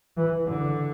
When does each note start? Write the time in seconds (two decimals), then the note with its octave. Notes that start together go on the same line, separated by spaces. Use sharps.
0.17 E3
0.47 D3